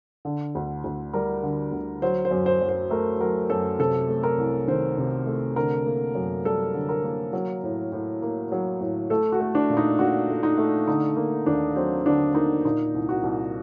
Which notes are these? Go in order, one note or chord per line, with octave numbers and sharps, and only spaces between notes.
D3
D2
D2
G3 A#4
D3
D2
F#3 C5
C5
F#2
C5
F#2
C5
A3 A#4
F#3 A#4
F#2 A4
C3 A4
A3
A#4
C2
D#3 C5
C3
A3
D3 A#4
A#3
F#2
G3 A4
D3
A#4
A#3
F#3
A2
A2
A#3
F#3
A2
A3 A4
F#4
A3
D4
A#2
D#4
A#2 F#4
A3
D#4
A3
D3 D#4
A#3
D#2 D4
F#3 C4
D3 D4
A#3 D#4
A#2 D#4
C2
F#4
C2